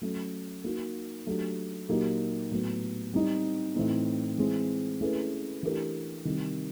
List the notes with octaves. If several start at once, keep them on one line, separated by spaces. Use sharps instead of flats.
F#3 A3 C#4
A#3 D#4 F#4
F#3 A3 D4 G4
A#2 F#3 A#3 D#4 G4
A2 F#3 B3
G3 C4 D#4
A2 E3 A3 C4 D#4
E3 G#3 C4
A3 C#4 E4 G#4 B4
E3 A3 D4 G4 A#4
C3 D#3 G3